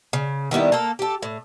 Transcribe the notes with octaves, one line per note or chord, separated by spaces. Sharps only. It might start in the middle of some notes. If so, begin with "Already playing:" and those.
C#3
D#3 G3 B3 E4
A#3 A4
G4 A4
A2